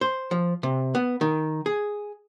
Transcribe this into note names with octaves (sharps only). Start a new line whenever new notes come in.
C5
F3
C3
B3
D#3
G#4